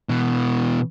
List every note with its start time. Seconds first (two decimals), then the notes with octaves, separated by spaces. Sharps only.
0.09 B2 E3